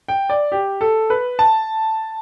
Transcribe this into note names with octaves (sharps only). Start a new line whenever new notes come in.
G5
D5
G4
A4
B4
A5